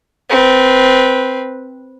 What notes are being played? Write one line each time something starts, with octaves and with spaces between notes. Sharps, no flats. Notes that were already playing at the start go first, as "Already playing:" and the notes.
C4 B4